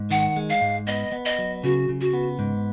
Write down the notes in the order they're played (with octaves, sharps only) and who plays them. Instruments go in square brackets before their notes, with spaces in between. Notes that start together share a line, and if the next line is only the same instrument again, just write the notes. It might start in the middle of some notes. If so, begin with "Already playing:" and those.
Already playing: [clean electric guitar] G#2
[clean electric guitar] D#3 [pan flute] F#5
[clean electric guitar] G#3
[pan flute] F5
[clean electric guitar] G#2
[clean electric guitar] B3 [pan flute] D#5
[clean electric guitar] B3
[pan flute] D#5
[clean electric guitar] F#3
[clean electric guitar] C#3 [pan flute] F#4
[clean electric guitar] C#3
[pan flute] F#4
[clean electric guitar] B3
G#2